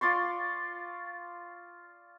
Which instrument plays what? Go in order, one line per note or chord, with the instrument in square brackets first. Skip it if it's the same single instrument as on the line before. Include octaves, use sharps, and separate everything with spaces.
[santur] F4 D5 C6 C#6